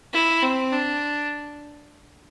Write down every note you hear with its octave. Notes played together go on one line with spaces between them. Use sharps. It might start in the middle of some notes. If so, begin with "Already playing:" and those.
E4
C4
D4